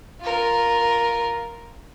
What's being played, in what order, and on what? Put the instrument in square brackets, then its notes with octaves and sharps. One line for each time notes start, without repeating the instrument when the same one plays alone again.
[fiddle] F4 A#4